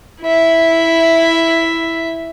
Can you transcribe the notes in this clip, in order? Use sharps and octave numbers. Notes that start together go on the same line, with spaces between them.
E4 E5